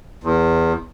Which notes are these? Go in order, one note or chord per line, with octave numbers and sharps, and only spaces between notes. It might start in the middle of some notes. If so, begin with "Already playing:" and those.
E2